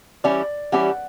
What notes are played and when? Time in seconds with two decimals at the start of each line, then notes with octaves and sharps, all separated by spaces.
0.24 E3 G3 C#4 E4 G4 D5
0.72 E3 G3 C#4 E4 G4 F#5